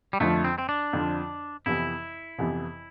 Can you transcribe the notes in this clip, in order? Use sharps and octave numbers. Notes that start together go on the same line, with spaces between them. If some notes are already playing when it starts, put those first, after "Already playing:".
G3
F2 D3 F3 A3
C4
C4
D4
F2 D3 F3
F2 C3 E3 B3 E4
F2 C3 E3 B3